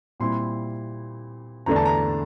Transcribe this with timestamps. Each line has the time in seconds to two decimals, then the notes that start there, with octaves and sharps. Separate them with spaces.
0.20 A#2 G3 C4 E4 C6
1.66 E2 D3 A3 D4 A#5
1.76 A5
1.85 A#5